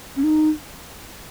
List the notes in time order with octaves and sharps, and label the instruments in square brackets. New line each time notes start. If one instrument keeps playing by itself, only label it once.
[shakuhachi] C#4
D#4